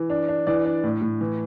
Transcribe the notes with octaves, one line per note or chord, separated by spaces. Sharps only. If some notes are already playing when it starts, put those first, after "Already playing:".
Already playing: E3
D4
D4
E3 D5
D4
A2
A2
E3